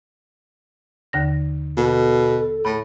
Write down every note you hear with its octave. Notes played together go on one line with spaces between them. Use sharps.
D#2 D3 A#6
B2 A4
A2 B5